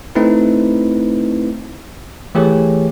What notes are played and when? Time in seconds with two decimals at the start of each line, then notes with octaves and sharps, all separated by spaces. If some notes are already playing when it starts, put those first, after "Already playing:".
0.15 A3 C4 D#4 E4 B4
2.35 E3 A3 G4 G#4 C#5